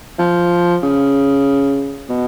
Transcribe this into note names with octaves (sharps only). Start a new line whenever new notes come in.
F3
C#3
B2